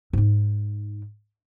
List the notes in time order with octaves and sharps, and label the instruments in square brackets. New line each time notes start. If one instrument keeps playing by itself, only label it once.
[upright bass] G#2 D#4